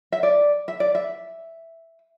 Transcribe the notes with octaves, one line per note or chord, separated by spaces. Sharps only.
E5
D5
E5
D5
E5